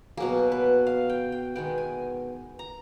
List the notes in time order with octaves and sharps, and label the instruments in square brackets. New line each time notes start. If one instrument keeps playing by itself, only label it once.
[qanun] B2 F#3 A#3 G#4
B4
F5
G5
G5
D#3 G#3 B3 G5
G#5
A#5